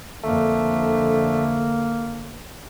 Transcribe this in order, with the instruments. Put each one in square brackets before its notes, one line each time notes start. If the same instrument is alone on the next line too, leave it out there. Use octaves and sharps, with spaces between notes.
[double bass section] F2 D3 [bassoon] A3 [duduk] A#3